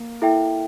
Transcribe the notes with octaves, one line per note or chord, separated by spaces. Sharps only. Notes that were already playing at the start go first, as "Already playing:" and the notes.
Already playing: A#3
E4 A4 E5 G5